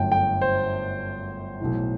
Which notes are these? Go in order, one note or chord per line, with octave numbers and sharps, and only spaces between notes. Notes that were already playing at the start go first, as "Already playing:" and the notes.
Already playing: G1 F#2 D3 A3 G5
G5
C5
B1 A2 E3